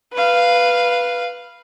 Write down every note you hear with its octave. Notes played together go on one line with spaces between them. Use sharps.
B4 F5